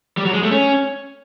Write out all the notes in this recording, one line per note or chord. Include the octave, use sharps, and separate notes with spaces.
G3
F#3
G#3
A3
C#4